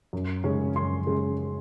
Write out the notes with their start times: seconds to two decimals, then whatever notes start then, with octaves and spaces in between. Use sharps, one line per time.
0.13 F#2
0.44 C#3 G#3 C#4
0.75 F#2 C6
1.07 C#3 G#3 C#4